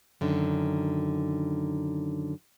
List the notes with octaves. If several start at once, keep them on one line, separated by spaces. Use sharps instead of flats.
F#2 D3 D#3